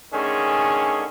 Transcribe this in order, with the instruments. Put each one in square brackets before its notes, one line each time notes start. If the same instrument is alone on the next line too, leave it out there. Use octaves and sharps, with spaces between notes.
[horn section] D3 D#3 A3 C#4 G#4